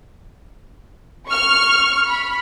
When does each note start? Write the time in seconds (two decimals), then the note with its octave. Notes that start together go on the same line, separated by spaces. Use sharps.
1.29 C#6 F6
2.09 B5